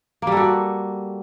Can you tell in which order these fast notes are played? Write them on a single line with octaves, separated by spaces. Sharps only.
A#3 G3 A4 F#4